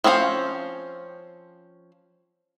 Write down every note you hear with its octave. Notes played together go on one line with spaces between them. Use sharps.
F3 C4 C#4 G#4 F5